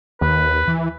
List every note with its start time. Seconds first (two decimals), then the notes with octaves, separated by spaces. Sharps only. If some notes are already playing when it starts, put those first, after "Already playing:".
0.21 D#2 B4
0.67 E3